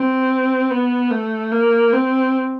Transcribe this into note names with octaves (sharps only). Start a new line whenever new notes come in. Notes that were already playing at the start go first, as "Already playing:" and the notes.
Already playing: C4
B3
A3
A#3
C4